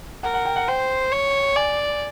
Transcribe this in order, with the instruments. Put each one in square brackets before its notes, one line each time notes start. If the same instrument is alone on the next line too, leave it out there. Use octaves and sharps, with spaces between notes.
[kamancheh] A#4 [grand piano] F#5
[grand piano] F#5
G5
F#5
[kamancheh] C5 [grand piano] G5
[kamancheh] C#5
[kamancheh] D5 [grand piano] G#5